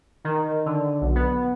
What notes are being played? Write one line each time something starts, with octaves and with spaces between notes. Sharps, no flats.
D#3
D3
B1
B3